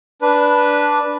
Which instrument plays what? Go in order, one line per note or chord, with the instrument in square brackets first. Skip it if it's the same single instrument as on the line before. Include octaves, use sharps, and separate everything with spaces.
[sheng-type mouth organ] D4 B4